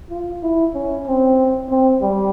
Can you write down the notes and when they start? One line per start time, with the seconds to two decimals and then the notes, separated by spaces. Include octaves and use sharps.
0.10 F4
0.43 E4
0.74 C#4
1.07 C4
1.70 C4
2.01 G3